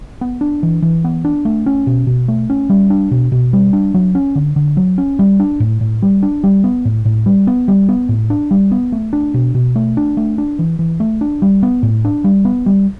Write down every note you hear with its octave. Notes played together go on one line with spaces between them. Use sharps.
B3
D4
E3
E3
B3
D4
A3
C#4
B2
B2
A3
C#4
G3
D4
B2
B2
G3
D4
F#3
C#4
D3
D3
F#3
C#4
G3
D4
A2
A2
G3
D4
G3
B3
A2
A2
G3
B3
G3
B3
A2
D4
G3
B3
A3
D4
B2
B2
A3
D4
A3
D4
E3
E3
A3
D4
G3
B3
A2
D4
G3
B3
G3